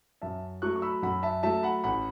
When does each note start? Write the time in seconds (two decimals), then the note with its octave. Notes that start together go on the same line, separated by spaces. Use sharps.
0.22 F#2 E5 A5
0.62 F#3 A3 C#6 F#6
0.76 C#6
0.82 B5 E6
1.02 F#2 F#5 B5
1.23 E5 A5
1.43 F#3 A3 E5 A5
1.63 F#5 B5
1.84 A1 F#5 B5